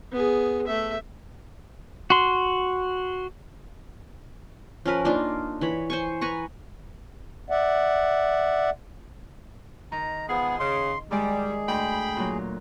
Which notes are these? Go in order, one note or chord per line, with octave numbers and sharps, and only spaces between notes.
B3 G#4
A3 E5
F#4 C6
F3 C#4 A#4 B4
A#3 D4 D#4 F4
E3 C#5 B5
C5 G#5 C#6
B4 G#5 A#5 C#6
D5 E5 F#5
D#3 A#5
F3 G#3 B3 G#4
C#3 C6
D#3 G3 G#3 G#4 D5
D2 G5 B5
A#2 F#3